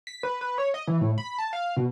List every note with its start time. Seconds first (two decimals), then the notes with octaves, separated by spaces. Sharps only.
0.07 B6
0.23 B4
0.41 B4
0.58 C#5
0.74 D#5
0.87 E3
1.01 A2
1.18 B5
1.39 A5
1.53 F5
1.77 B2